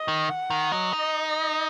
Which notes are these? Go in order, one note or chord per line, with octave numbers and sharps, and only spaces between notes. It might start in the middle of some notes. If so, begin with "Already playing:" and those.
Already playing: D#5
D#3
F#5
D#3
F#3 D#5
D#4